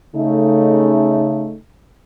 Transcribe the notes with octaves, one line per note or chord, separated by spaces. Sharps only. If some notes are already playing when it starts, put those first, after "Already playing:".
C#3 A3 D#4